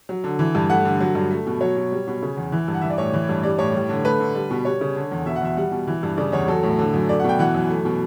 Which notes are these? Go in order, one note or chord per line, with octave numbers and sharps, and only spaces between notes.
F#3
D3
E3
G2
A3 F#5
D3
F#3
G2
A3
B2
F#3 C#5
B2
G3
B2
C#3
E2
E3
G2
F#5
E3 E5
D5
A2 C#5
E3
G2
G3 D5
A2 C#5
G3
D3
A3 B4
D3
G3
B2
G3 C#5
C#3
D3
E2
B2 E5
F#5
E2 E5
G3 F#5
B2
E3
G2
C#3 D5
E2 C#5
F#3 A4
A2
D3
F#2
A3 D5
F#5
B2 G5
E3 F#5
F#2
A3
B2